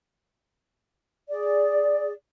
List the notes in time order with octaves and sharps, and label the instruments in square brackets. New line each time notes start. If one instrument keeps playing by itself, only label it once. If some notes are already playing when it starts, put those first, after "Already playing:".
[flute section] G#4 D5